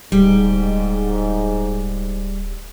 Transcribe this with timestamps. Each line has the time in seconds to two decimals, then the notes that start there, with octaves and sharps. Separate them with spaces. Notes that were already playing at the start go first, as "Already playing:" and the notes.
0.12 D1 G#2 G3